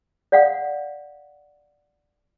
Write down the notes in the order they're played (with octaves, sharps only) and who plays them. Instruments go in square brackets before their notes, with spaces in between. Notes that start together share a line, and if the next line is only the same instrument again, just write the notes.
[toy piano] D5 F5 F#5